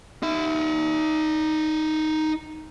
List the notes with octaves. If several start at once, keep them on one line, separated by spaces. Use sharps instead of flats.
D#4 E5